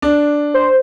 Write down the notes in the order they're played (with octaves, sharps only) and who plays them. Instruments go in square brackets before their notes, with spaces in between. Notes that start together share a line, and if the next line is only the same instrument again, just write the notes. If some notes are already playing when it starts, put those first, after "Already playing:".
[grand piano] D4
[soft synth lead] C5